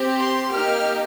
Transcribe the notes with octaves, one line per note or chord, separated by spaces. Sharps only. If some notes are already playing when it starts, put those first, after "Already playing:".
Already playing: C4 G4
C6
A#3 D#4 G4 F6